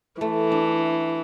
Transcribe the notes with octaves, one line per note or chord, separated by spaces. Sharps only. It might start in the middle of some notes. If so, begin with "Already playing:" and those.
E3 A3
D4